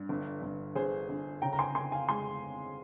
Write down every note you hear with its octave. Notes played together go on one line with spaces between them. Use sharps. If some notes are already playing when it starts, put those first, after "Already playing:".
Already playing: G2
G1
G1
G1 G#4 C5
G1
C#3 G5 A#5
A#5
G#5 C6
C#3 G#5 C6
F5 G#5
G#3 G#5 C6